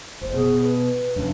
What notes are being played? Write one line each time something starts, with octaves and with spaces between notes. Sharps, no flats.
F#1 C5
B2 G#4
B4
F#2 C#3 D4